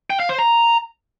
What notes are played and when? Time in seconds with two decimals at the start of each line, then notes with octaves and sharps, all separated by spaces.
0.10 G5
0.20 F5
0.29 C5
0.39 A#5